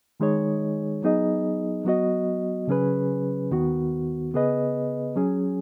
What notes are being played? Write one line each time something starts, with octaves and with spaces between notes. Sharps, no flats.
D#3 G#3 D#4 G#4 C#5
F#3 B3 D#4 G#4 D#5
F#3 B3 F#4 D#5
C#3 F#3 C#4 G#4 B4
D#2 D#3 B3 F#4
C#3 B3 G#4 B4 D#5
F#3 C#4 G#4